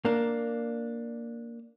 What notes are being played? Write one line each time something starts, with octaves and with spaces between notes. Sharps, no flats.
A#3 D4